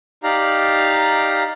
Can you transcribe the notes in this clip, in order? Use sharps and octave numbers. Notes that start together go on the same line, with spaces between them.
D#4 G4 D5 F5 A#5